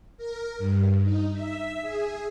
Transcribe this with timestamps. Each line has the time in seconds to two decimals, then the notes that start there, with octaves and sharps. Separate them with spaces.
0.17 A#4
0.58 G2
1.03 D#4
1.33 E5
1.82 G#4